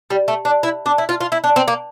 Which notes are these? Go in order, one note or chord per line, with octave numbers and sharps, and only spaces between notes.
G3
A3
D4
E4
D4
E4
F4
F4
E4
D4
C4
A#3